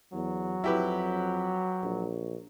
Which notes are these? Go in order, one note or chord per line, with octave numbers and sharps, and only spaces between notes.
E2 F#3
F2 E4 G4 B4
A#1